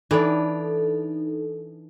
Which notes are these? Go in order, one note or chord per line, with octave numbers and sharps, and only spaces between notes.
E3 D4 D#4 A4